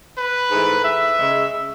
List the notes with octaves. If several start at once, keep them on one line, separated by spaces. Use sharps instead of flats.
B4
G#2 E3 A3
E5
C#3 G#3